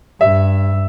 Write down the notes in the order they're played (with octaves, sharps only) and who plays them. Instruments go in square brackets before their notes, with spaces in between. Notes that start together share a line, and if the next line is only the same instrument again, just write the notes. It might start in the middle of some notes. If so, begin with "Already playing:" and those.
[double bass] G2 [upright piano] E5